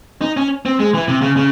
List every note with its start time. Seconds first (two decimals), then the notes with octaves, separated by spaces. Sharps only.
0.22 D#4
0.37 C#4
0.66 C4
0.80 G#3
0.94 E3
1.08 C3
1.22 C#3
1.37 C#3